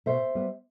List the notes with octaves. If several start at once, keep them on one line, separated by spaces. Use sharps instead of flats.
B2 C5 E5
G3 B3